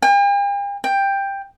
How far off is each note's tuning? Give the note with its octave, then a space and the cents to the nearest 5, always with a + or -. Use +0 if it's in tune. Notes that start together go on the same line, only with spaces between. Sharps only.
G5 +45
G5 +10